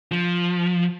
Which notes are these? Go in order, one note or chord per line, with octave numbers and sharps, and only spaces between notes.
F3